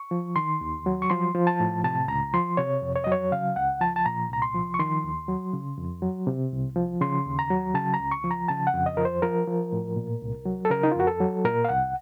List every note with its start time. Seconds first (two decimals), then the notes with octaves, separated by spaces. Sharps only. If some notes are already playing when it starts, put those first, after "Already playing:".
Already playing: C#6
0.11 F3
0.36 D#3 C6
0.61 D#2
0.86 F#3
1.02 C#6
1.10 F3 C6
1.35 F3
1.47 A5
1.60 A2
1.84 C3 A5
2.08 C#2 A#5
2.33 F3 C6
2.57 C3 C#5
2.82 F2
2.95 C#5
3.04 F#3 D#5
3.12 C#5
3.32 C#3 F5
3.56 C#2 F#5
3.81 F3 A5
3.96 A5
4.06 A#2 A#5
4.30 C2 A#5
4.42 C6
4.54 F3
4.74 C#6
4.79 D#3 C6
5.04 D#2
5.28 F#3
5.53 C#3
5.78 F2
6.02 F#3
6.27 C3
6.52 C2
6.76 F3
7.01 C#3 C6
7.25 D#2
7.39 A#5
7.50 F#3
7.75 C#3 A5
7.94 A#5
8.00 C#2
8.12 C#6
8.24 F3
8.31 A#5
8.48 C#3 A5
8.67 F#5
8.74 F2
8.86 D#5
8.97 F3 A#4
9.05 C5
9.22 F3 A#4
9.47 F3
9.72 A2
9.96 A#2
10.22 C2
10.45 F#3
10.65 A4
10.70 C#3 A#4
10.83 D#4
10.92 F4
10.96 F2 F#4
11.07 A4
11.20 F#3
11.45 A#2 A#4
11.65 F5
11.69 C2 F#5